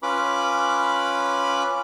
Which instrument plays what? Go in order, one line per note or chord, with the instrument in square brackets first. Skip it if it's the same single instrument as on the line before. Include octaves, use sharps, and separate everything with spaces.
[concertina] C#4 F4 B4 B5 D6